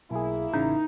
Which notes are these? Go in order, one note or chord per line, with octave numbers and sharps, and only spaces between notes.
B1 A#3 E4 G#4
A1 C#3 D#4